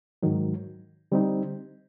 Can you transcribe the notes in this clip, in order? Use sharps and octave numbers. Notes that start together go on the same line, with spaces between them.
G#2 D#3 F#3
D3 G3 C4 D#4